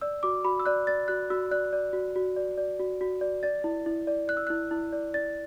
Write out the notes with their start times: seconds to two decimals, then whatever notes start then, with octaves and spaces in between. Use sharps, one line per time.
0.01 D5 E6
0.23 F#4 D6
0.45 F#4 B5
0.60 E6
0.66 D5 F#6
0.87 D5 A6
1.08 F#4 F#6
1.30 F#4 E6
1.51 D5 F#6
1.73 D5
1.93 F#4
2.16 F#4
2.36 D5
2.58 D5
2.80 F#4
3.01 F#4
3.21 D5
3.43 D5 A6
3.64 E4
3.86 E4
4.07 D5
4.28 D5 F#6
4.37 E6
4.47 E4 F#6
4.71 E4
4.93 D5
5.14 D5 A6